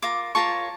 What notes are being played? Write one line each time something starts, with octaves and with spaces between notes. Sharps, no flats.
F4 A#4 D6
F4 A#4 C#5 A5 C#6